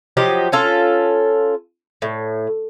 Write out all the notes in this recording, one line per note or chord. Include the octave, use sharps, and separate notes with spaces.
F3 F#3 G4 D#5
C#4 F4 A4
A2